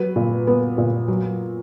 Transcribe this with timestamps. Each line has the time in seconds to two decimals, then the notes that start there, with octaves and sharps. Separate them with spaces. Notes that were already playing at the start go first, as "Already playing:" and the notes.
Already playing: F#3 B4
0.16 A#2
0.47 B3
0.78 A#2
1.08 F#3